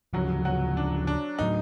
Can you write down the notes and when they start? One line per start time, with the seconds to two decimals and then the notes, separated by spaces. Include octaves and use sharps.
0.13 D2 C#3 F3 F#3 F#4
0.45 F#3 F#4
0.77 D4
1.07 D4
1.39 A2 F#3 D#4